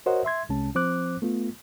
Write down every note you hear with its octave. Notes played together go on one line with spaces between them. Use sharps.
F#4 A#4 C5 C#5 D#5 F#5
E5 C6 G#6
C2 C3 G#3 C#4 A5
F3 C4 C5 D6 F#6
A3 B3 F4